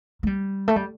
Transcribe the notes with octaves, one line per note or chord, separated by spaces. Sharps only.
A3
G3
A3
G3